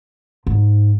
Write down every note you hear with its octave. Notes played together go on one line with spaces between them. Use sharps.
G#2